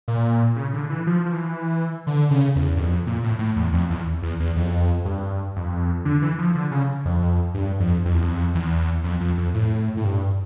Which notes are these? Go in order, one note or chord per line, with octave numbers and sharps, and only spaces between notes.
A#2
C#3
D3
E3
F3
F3
E3
D3
C#3
E2
G2
F2
A#2
A2
A2
E2
F2
E2
E2
E2
F2
G2
F2
D3
E3
F3
D3
C#3
F2
G2
F2
F2
E2
F2
E2
F2
F2
F2
A2
A2
G2